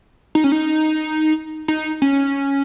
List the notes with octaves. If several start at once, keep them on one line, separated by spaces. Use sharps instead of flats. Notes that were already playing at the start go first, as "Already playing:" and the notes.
D#4
C#4
D#4
D#4
C#4